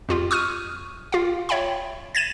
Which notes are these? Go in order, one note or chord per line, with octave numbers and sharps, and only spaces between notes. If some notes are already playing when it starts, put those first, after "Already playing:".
F2 F4 G4
C#6 D#6 F6 D#7
F4 F5
C#5 E5 G5 B5
G#6 A6 D#7 E7